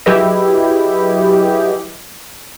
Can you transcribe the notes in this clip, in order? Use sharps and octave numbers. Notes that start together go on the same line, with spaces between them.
F#3 E4 G4 G#4 B4 D#5